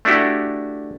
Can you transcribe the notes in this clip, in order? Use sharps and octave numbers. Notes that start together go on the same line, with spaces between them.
A3 D4 E4 F#4 G4